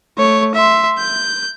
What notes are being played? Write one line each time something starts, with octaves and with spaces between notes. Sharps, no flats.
A3 C#5
E5 C6
G6